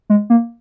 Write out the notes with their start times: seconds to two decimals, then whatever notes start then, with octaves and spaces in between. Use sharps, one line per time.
0.10 G#3
0.30 A#3